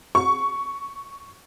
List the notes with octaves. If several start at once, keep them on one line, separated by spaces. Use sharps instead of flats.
C#6